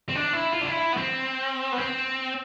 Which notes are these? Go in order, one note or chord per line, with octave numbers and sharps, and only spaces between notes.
C4
D4
E4
F4
D4
E4
B3
C4
B3
C4